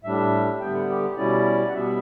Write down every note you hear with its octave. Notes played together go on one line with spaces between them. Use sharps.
A2 G3 D4 E5
D3 G3 B3 G5
F#5
G4
B2 G3 C#4 E4 D5
F#5
B2 G3 B3 E5